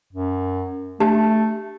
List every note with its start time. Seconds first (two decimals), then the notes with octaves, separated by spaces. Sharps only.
0.13 F#2
1.00 A3 D4 G4 A5